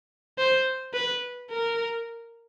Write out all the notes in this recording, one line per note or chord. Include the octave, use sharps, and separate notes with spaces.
C5
B4
A#4